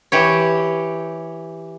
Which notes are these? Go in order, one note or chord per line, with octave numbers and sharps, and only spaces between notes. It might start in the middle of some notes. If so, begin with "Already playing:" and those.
E3 G4 C#5